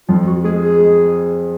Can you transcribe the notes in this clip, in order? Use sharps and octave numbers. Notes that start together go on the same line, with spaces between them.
F2 F4
F#4
G#3 G#4
G#4
G#3